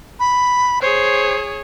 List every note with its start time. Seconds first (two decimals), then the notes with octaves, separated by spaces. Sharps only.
0.20 B5
0.82 G#4 C5 C#5